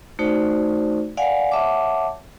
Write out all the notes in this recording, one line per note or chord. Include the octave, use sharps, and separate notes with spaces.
A3 D#4 F#4 C5 D5
D5 F5 F#5 G#5
C#5 E5 F#5 A5 D6